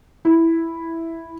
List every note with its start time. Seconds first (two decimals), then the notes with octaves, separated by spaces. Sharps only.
0.25 E4